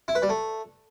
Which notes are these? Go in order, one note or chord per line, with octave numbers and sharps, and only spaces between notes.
E4
B4
G3
A3